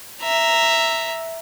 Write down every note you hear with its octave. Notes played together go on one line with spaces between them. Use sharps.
E5 A#5